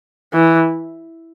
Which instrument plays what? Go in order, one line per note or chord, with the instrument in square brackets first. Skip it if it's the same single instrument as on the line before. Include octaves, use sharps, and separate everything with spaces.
[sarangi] E3